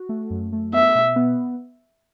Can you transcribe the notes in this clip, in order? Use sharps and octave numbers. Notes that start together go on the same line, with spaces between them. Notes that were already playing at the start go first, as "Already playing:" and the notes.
Already playing: F#4
A3
F#2
A3
B3 E5
B2
B3